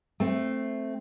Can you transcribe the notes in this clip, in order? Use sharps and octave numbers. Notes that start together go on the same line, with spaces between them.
A3 C4